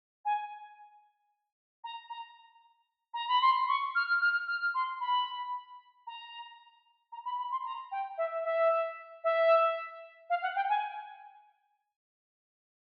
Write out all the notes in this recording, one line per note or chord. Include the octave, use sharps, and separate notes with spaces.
G#5
A#5
A#5
A#5
B5
C6
C#6
F6
F6
F6
C6
B5
A#5
A#5
B5
B5
C6
A#5
G5
E5
E5
E5
F5
F#5
G5
G#5